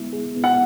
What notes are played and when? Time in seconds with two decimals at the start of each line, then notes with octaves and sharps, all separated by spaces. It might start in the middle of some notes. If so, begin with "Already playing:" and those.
Already playing: G#3 B3 E4
0.13 G#4
0.36 B3
0.44 F#5